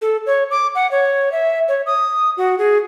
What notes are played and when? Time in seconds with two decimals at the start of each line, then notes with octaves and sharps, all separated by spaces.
0.02 A4
0.26 C#5
0.51 D6
0.75 F#5
0.91 C#5
1.32 E5
1.68 C#5
1.86 D#6
2.37 F#4
2.58 G#4